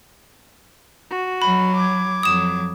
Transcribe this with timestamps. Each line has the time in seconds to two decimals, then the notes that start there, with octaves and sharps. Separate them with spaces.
1.10 F#4
1.42 F#3 B5
1.76 D6 G#6
2.23 F2 F#3 D#6 E7